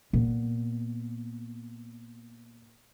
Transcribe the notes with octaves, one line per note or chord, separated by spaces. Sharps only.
A#2 B3